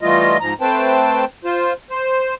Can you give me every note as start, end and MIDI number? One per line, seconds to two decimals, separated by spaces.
0.01 0.37 52
0.01 0.37 55
0.01 0.37 57
0.01 0.37 65
0.01 0.37 75
0.40 0.54 44
0.40 0.54 53
0.40 0.54 82
0.61 1.25 57
0.61 1.25 60
0.61 1.25 71
0.61 1.25 72
0.61 1.25 79
0.61 1.25 81
1.44 1.73 65
1.44 1.73 72
1.90 2.34 72